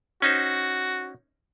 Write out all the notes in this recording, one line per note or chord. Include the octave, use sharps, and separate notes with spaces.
C#4 D#4 F#4 C5